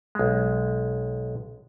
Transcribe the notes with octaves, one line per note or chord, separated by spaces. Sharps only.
B1 G#3